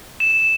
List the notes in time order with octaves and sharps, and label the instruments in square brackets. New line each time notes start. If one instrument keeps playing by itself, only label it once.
[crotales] E7